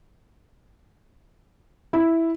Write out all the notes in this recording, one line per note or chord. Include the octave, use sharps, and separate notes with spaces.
E4